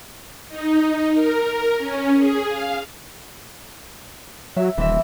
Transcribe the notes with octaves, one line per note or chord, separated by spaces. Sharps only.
D#4
A#4
C#4
G#4
F5
F#3 E5
D#1 E3 C4 E5